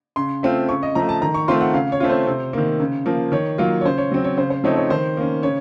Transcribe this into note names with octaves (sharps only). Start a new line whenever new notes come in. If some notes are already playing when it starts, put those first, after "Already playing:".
C#3 C6
A3 C4 F4
C#3 C#6
D#5
F3 A3 A#5
A5
D#3 A#5
C#6
A3 C4 F4 C6
F#5
C#3 F5
C#5
A3 C4 F4
C5
C3
D#3 A#3
C#3
F3 A#3
D#3 C#5
F#3 A#3 F4
C#5
C#3 C5
C#5
F#3 C4
C#5
C#3 C5
C5
F3 A3 C4 D#4 C#5
C#5
D#3 C5
A#3 C#4
C#3 C#5